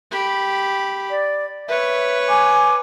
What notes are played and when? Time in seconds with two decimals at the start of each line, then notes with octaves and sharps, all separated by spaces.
0.11 G4 B5
1.11 D5
1.68 B4 C#5 E5
2.29 G#5 D6